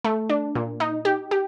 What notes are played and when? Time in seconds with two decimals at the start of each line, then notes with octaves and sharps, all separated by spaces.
0.04 A3
0.30 D4
0.55 A#2
0.80 D#4
1.05 G4
1.31 G4